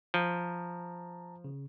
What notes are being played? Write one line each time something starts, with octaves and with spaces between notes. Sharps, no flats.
F3 A5 A#5
C#3